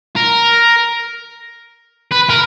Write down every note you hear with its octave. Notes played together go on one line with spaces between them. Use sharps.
A#4
B4
A#4